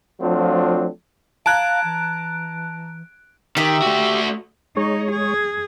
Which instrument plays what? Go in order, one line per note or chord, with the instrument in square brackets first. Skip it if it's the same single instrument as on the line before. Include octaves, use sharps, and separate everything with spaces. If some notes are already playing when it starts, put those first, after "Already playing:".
[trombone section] F3 F#3 A3 C4 D4 F4
[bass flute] F5 [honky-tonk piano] A5 A#5 G#6 [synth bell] F#6 D7
[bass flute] E3
[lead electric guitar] D#3 [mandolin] G4 E5
[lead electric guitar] A3 F#4
[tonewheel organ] G#3 C#5 [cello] D#4
[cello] G#4